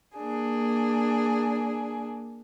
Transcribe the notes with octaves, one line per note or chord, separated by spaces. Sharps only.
A#3 D4 G#4